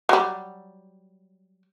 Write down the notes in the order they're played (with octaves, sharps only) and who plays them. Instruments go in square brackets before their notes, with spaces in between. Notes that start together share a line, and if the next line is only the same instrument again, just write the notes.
[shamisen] F#3 G3